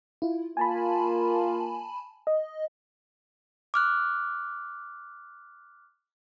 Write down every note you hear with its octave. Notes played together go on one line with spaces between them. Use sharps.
E4 F4
A#3 F4 G#5 A5 B5
D#5
D6 F6 F#6